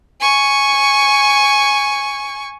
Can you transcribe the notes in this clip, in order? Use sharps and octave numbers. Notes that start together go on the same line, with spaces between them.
G#5 C#6